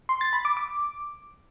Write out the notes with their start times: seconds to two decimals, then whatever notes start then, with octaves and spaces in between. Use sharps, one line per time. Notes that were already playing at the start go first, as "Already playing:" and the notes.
0.09 C6
0.21 A6
0.33 B5
0.45 D6
0.57 D6